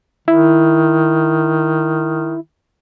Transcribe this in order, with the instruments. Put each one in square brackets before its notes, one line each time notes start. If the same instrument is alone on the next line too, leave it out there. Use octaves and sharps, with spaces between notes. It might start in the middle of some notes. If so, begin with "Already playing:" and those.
[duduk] D#3 [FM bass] E4